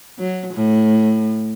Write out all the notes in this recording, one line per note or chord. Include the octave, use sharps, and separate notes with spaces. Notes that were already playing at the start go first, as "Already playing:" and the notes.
F#3
A2